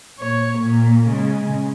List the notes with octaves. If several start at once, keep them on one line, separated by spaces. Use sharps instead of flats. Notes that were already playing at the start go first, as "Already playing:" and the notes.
A#2 C#5
A#2 A#3
C#3 G#3